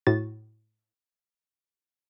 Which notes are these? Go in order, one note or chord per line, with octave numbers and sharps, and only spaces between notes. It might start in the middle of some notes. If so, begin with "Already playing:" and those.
A2 F#4 A6